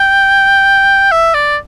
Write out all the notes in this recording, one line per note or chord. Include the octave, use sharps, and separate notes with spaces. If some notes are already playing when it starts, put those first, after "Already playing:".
Already playing: G5
E5
D5